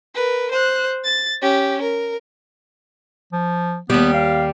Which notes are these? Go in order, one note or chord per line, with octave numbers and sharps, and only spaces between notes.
A#4 B4
C5 F#6
A6
C#4 G4
A#4
F3
D#2 G3 B3
F5